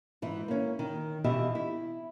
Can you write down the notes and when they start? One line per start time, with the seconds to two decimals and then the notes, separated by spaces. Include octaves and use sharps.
0.22 G#2 E3
0.48 A#3 C#4
0.79 D#3
1.24 B2 E3 F4 G4 D#5 E5
1.55 E4